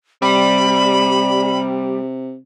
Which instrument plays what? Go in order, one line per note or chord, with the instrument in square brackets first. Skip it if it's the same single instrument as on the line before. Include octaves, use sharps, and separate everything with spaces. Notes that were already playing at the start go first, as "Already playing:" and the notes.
[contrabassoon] C3 [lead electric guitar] G3 [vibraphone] D5 [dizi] B5